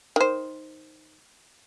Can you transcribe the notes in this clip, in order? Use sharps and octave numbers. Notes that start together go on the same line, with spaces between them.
D#3 C5